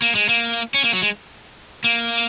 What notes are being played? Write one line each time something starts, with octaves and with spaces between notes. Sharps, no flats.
A#3
G#3
A#3
C#4
A#3
F#3
G#3
A#3